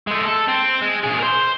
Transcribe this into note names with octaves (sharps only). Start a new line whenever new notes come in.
G#3 A3
A4
C4
G#3
A#2 G#4
A#4 C5